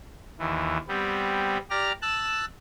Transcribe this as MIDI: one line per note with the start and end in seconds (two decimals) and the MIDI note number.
0.39 0.78 39
0.39 0.78 52
0.88 1.57 55
0.88 1.57 59
0.88 1.57 60
1.70 1.92 67
1.70 1.92 74
1.70 1.92 82
1.70 1.92 89
2.02 2.45 81
2.02 2.45 88
2.02 2.45 90